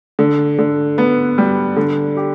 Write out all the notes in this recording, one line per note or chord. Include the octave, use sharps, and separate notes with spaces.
D3
D3
B3
G3
D3
G4